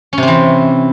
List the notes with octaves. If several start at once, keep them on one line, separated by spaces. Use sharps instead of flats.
C3 E3 C4 C#4